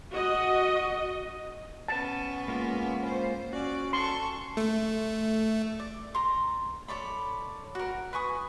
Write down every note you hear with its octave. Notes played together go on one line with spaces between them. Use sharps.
F#4 D#5
B3 C#4 A5
G#3 A#3 F4
C5
C#4 F#4 D5
A4 C6 C#6
A3
D5
A#5 C6
A4 C#5 D5 B5
F#4 A#4
B4 G#5 C#6 D#6